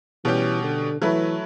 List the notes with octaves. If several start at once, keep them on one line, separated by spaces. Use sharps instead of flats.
B2 E3 G3 C#4 G4
D3
E3 F#3 A3 E4 B4